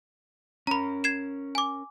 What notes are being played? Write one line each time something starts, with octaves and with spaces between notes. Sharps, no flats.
C#4 A#4 A#5 B5
G#6 C7 E7
G#5 D6